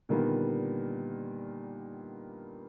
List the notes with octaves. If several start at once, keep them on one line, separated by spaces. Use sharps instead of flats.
A#2 D3 D#3 G3 A#3 B3